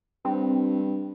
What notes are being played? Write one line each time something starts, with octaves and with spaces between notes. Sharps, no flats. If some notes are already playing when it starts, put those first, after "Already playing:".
G2 C4